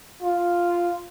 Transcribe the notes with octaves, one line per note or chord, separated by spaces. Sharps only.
F4